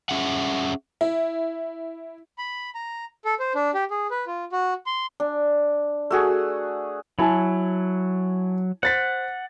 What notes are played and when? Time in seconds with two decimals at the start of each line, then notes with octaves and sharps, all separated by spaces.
0.09 C#4 G#4 E5 F#5
1.01 E4
2.38 B5
2.75 A#5
3.25 A4
3.39 C5
3.55 D4
3.74 G4
3.91 G#4
4.11 B4
4.27 F4
4.52 F#4
4.86 C6
5.20 D4
6.11 A3 F#4 G#4
7.19 F#3 E4 G#5 A5
8.83 C5 F#5 A6 B6